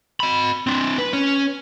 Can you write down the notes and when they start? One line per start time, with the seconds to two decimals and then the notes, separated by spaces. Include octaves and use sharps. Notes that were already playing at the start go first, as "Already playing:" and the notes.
0.20 D#5 B5
0.67 C4 D4
0.98 B4
1.13 C#4